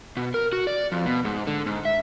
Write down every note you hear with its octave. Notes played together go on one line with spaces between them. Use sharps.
B2
A#4
F#4
D5
F2
B2
G#2
D3
G#2
E5